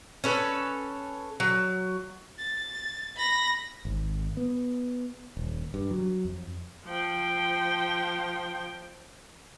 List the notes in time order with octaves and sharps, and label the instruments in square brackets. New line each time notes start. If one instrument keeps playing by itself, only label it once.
[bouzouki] C#4 A4 B4
F#3
[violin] A6
B5 A#6
[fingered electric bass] G#1
B3
D#1
G2
F#3
F2
[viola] F3 G5